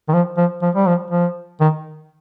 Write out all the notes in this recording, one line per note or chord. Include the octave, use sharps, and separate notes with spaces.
D#3
F3
F3
F3
G3
F3
F3
D#3